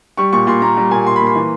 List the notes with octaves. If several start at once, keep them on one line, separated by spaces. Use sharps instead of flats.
G3 C#6
A#2 C#6
A#2 C6
A#3 A#5
G3 A#5
A#2 G#5
A#2 C6
A#3 B5
C6
E3